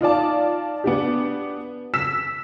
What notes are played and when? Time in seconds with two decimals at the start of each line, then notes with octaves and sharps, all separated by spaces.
0.01 D#4 F4 D5 A5
0.84 B3 D4 G4
1.94 E6 B6 E7